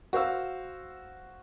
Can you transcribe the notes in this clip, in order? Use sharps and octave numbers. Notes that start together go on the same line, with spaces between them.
F#4 C5 F5 E6